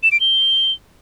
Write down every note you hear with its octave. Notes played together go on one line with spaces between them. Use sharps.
E7
D7
G7